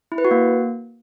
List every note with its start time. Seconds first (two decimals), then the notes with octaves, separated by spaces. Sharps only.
0.12 E4
0.18 B4
0.25 F#4
0.31 A#3